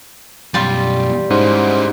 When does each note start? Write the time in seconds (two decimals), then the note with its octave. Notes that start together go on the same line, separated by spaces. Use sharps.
0.54 F#2 B2 G3 F4
1.30 G#2 C#4 E4 C5